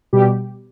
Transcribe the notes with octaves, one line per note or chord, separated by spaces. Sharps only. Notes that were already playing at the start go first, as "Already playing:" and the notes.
B2 G3 G4